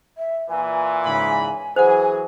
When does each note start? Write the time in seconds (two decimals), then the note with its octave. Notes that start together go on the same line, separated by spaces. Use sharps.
0.17 E5
0.50 A#2 E3 G#5
1.05 G#2 C#3 B5
1.76 E3 F#3 G#4 C5 F#5 G#5